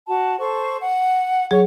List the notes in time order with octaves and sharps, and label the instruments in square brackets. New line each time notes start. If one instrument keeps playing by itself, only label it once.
[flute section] F#4 A5
A4 C5 C#6
F#5
[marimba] F#3 G#4 [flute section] C#5